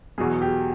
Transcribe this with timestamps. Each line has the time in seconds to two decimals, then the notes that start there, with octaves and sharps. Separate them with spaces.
0.18 E2 B2 F#3 G#4
0.41 G4